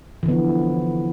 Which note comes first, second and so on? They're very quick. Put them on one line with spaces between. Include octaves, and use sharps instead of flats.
E3 D3 B3 F3